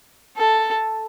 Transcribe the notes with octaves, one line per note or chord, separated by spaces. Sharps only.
A4